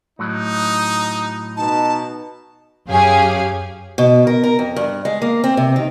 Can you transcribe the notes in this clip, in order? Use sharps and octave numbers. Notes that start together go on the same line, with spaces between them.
A2 F#3 D#4
B2 D#4 A5
F#2 G4 G#4 C#5 F5 G#5
B2
A#4
A#4
F2
G2
G#3
A#3
C4
C3
D#3